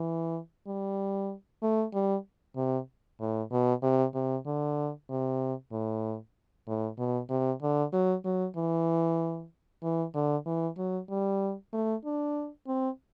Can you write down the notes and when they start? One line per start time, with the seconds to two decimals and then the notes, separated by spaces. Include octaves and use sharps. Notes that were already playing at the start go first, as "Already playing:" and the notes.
Already playing: E3
0.67 G3
1.62 A3
1.94 G3
2.56 C3
3.20 A2
3.51 B2
3.83 C3
4.14 C3
4.46 D3
5.10 C3
5.72 A2
6.67 A2
6.98 B2
7.30 C3
7.62 D3
7.93 F#3
8.25 F#3
8.57 E3
9.83 E3
10.14 D3
10.46 E3
10.78 F#3
11.10 G3
11.73 A3
12.05 D4
12.67 C4